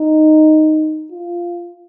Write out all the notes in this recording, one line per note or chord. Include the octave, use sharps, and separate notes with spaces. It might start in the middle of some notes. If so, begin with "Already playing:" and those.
Already playing: D#4
F4